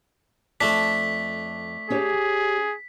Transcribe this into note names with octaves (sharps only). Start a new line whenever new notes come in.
F2 A3 D4 A5 B6
C#4 G4 G#4 C#5